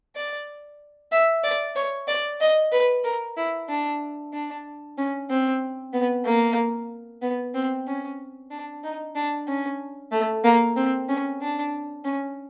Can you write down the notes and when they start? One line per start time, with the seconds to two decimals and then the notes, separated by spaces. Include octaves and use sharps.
0.16 D5
1.12 E5
1.44 D5
1.76 C#5
2.08 D5
2.41 D#5
2.72 B4
3.04 A#4
3.37 E4
3.69 D4
4.33 D4
4.98 C#4
5.30 C4
5.93 B3
6.26 A#3
7.22 B3
7.54 C4
7.88 C#4
8.51 D4
8.84 D#4
9.15 D4
9.48 C#4
10.12 A3
10.44 A#3
10.76 C4
11.09 C#4
11.41 D4
12.05 C#4